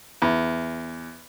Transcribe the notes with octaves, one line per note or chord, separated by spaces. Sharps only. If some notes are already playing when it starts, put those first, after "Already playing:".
E2